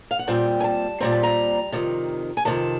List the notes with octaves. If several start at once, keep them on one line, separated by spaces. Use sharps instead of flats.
F5
F#5
A#2 G3 C4 G5
G#5
A5
A#2 G3 C4 A#5
A5
A#5
F2 C3 D#3
G#5
F2 C3 D#3 A5